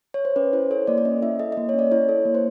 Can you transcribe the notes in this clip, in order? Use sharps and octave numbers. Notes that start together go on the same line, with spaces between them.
C#5
C5
C#4 B4
E4 C5
A4 C#5
A#3 D5
D5
C#4 D#5
E4 E5
A4 D#5
A#3 D#5
C#5
C#4
D5
E4 C#5
A4
A#3
C5